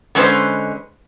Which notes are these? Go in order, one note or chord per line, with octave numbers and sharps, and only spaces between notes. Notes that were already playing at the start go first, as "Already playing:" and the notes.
D3 G#3 C#4 B4 C5